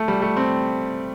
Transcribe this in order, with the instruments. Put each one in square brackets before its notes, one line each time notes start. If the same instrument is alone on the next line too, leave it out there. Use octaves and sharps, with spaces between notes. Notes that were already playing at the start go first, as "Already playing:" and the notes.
Already playing: [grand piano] A3
G3
A3
C4